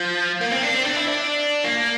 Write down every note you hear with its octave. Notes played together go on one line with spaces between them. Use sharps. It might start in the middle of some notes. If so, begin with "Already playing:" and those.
Already playing: F3
A#3
C4
D4
C4
D4
E4
D4
A#3